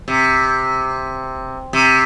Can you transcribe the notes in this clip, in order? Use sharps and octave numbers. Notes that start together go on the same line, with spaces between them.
C3
C3